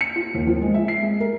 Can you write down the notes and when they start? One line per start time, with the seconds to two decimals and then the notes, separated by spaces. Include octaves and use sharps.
0.01 C#7
0.16 F4
0.34 D#2
0.47 F3
0.62 G#3
0.74 E5
0.88 C7
1.02 G#3
1.20 A#4